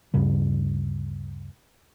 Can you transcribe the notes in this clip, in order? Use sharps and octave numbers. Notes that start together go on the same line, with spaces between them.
D2 G2 C#3 G3